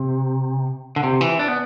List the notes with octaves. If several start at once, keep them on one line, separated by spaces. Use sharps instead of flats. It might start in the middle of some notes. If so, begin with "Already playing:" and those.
Already playing: C3
D3
C3
E3
D4
B3